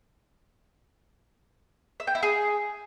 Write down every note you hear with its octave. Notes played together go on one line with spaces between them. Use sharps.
E5
G5
E4
G#4